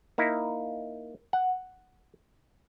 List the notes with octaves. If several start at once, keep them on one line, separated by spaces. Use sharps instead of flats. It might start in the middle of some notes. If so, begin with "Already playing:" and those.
A#3 D#4 E4
F#5